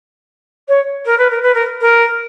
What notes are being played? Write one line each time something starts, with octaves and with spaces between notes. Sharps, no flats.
C#5
A#4
B4
A#4
B4
A#4
A#4